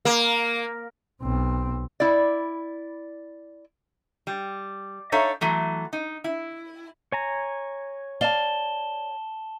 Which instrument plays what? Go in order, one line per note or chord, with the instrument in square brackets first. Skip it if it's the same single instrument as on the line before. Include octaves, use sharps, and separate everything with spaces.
[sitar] A#3
[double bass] B1 C4
[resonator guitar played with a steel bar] E4 D5
G3
D4 D#4 A4 C#5 E5 F5
E3 F#3 A3
D#4
E4
[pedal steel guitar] C#5 G#5 A#5
[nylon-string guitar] D5 F5 [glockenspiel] A5 E7 G7